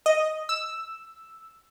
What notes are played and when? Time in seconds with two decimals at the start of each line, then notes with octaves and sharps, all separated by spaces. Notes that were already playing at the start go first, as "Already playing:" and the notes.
0.06 D#5
0.49 E6